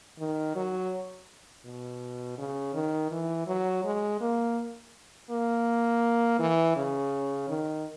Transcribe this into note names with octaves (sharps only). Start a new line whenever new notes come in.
D#3
F#3
B2
C#3
D#3
E3
F#3
G#3
A#3
A#3
E3
C#3
D#3